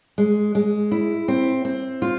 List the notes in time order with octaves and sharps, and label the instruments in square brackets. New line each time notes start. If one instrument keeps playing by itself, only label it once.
[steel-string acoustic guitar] G#3
G#3
E4
C4
C4
F4